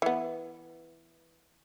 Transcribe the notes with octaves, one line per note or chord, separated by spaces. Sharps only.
E3 B3